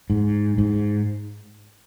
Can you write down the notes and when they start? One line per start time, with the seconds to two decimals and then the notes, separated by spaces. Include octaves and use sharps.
0.10 G#2
0.58 G#2